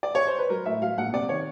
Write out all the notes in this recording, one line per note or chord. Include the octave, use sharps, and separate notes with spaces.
D5
C#5
C5
B4
F#3 A#4
A2 E5
F#3 F5
A#1 F#5
C3 D5
D#3 C#5